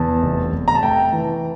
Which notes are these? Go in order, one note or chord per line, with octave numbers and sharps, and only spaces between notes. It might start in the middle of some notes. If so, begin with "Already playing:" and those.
Already playing: E2 A5
F1
F1
A#5
A5
A3 G5
E3